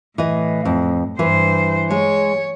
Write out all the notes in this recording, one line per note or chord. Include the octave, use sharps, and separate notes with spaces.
A2 E3 D#5
F2
G2 E3 E4 B4 C5
G#3 C#5